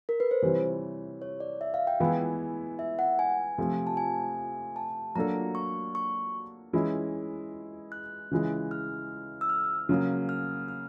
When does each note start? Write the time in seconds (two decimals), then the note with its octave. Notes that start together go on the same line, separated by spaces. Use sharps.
0.09 A#4
0.20 B4
0.31 C5
0.42 C3 E3 G3 C#5
1.22 C#5
1.40 D5
1.61 E5
1.74 F5
1.87 G5
2.00 E3 G#3 B3 E4 G#5
2.79 E5
2.99 F#5
3.19 G#5
3.58 C3 F3 A3
3.87 A5
3.97 G#5
4.76 A5
5.15 F#3 A#3 D4 F#4 A4 A#5
5.55 C#6
5.95 C#6
6.73 E3 G#3 C#4 E4
7.92 F#6
8.31 C#3 E3 G#3
8.71 F6
9.41 E6
9.49 F6
9.89 C#3 F#3 A#3
10.29 F6
10.68 F6